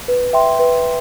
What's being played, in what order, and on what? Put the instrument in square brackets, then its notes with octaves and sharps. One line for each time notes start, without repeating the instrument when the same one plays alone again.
[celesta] B4
E5 G5 C6
B4